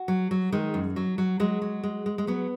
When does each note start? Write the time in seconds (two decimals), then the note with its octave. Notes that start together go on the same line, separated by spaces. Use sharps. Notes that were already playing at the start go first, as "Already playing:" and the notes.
Already playing: F#4
0.08 F#3
0.31 F#3
0.52 D#3 G#3
0.74 F#2
0.96 F#3
1.18 F#3
1.40 F#3 G#3
1.62 F#3
1.84 G#3
2.06 G#3
2.18 G#3
2.27 F#3 B3